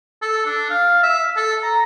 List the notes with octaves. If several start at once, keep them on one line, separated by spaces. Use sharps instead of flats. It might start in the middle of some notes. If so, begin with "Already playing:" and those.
A4
D4
F5
E5
A4
A#5